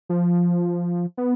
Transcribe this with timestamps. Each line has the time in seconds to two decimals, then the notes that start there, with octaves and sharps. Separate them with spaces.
0.09 F3
1.17 B3